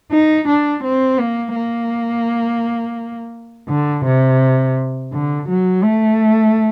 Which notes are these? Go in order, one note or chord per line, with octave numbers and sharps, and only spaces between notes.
D#4
D4
C4
A#3
A#3
D3
C3
D3
F#3
A3